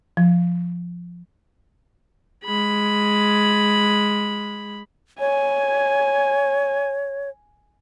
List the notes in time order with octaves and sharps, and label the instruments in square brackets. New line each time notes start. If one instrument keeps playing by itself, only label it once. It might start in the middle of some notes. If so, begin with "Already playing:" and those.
[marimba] F3
[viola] G#3 B5
[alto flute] C#5 [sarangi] G#5